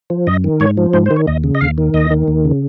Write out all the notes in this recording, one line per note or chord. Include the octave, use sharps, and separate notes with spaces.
F3
F#2 D#5
D#3
G#2 C#5
F3
G#2 C5
D#3 C5
C#5
D#2 D#5
C#3
D#5
D#2 F5
D#3
D#2 D#5
D#3
D#2
C#3